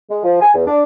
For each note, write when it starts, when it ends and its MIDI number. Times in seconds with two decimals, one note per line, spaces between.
0.09 0.23 56
0.24 0.41 53
0.42 0.53 80
0.54 0.63 40
0.67 0.83 62